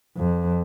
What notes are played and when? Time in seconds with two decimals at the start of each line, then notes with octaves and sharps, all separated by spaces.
0.17 F2